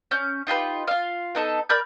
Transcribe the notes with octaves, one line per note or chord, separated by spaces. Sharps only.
C#4 G6
D#4 F4 G4 B4
F4 F5
B3 D#4 A4
A#4 D5 B5 G6